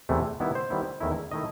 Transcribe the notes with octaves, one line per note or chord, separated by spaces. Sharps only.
E2 C3 E3 A3
D#3 G3 B3 E4
C5
D#3 G3 B3 E4
E2 D#3 A3 E4
D#3 A3 E4 D#5